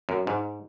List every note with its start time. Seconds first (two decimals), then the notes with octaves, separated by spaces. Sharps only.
0.09 F#2
0.27 G#2